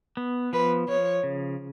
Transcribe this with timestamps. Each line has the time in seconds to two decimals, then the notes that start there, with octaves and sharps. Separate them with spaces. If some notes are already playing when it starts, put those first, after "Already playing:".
0.17 B3
0.53 F3 B4
0.88 F3 C#5
1.23 C#3